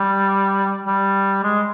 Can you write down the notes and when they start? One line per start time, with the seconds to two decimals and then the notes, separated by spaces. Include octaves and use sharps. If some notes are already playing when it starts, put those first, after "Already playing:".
Already playing: G3
0.85 G3
1.43 G#3